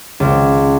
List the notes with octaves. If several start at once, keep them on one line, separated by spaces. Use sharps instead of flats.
C#2